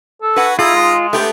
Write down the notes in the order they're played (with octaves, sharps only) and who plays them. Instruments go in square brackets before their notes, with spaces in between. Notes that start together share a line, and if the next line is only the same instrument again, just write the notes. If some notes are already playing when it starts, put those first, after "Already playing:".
[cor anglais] A4
[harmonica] F#4 G#5 [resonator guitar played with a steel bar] B4 F#5
[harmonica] D#3 D#5 A#5 [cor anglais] E4 [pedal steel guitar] F4 [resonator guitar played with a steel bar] G#4
[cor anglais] G#3
[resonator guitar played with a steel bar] A3 G4 [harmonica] B3 C4 G5